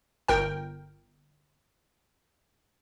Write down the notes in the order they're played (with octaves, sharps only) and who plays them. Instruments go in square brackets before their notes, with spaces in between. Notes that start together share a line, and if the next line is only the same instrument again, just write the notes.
[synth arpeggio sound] G1 A#4 G5